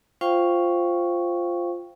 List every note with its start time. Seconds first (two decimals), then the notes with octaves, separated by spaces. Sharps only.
0.21 F4 C5 F5 G5 C#6